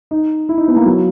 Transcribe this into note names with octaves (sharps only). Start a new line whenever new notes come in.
D#4
E4
D#4
B3
A#3
F#3